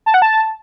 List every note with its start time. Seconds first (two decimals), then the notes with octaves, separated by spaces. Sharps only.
0.06 A5
0.14 F#5
0.22 A5